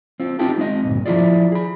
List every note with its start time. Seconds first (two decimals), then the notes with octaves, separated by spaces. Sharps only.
0.20 C4 F4
0.39 D#4 F4 G4 A4
0.58 G#3 C4 D#5
0.84 D2 G2 A#2
1.06 F3 E4 F4 G#4 D5
1.52 G#4 B5